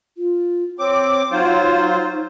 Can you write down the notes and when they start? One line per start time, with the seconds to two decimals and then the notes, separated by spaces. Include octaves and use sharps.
0.17 F4
0.79 C4 C#5 D6
1.31 F#3 D#4 F4 C5